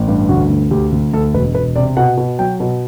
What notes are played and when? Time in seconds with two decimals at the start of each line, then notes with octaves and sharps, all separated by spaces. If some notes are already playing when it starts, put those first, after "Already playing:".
Already playing: A1
0.08 G2
0.29 D2 F#4
0.50 D2
0.71 D2 G4
0.92 D2
1.14 D2 A4
1.34 E1 B4
1.55 E1 B4
1.76 C3 D5
1.97 B2 F#5
2.17 B2
2.39 F#3 G5
2.60 B2